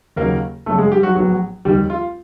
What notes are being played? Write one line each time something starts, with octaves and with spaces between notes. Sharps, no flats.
D#2 C#3 F#3 A#3 C#4 A#4
G1 F#2 C#3 A3 A4
G#3 G#4
G3 G4
F#3 F#4
A#1 A2 F#3 B3 F#4
F1 D#2 D#3 G3 G4
F4